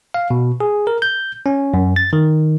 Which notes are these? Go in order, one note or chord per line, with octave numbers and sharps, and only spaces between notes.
F5
B2
G#4
A#4
G6
C#4
F#2
A6
D#3